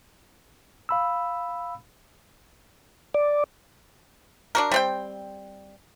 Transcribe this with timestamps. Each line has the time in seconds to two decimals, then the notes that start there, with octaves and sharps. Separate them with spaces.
0.89 F5 B5 E6
3.14 D5
4.55 D4 F#4 A#4
4.72 G3 C4 G5